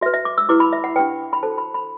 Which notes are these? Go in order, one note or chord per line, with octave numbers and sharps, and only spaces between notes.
F#4 B4 E5
E5
D6
E6
E4 G4 B4 D6
B5
E5
F#5
D4 G4 B4 G5
B5
D4 F#4 A4 C5 A5
B5
B5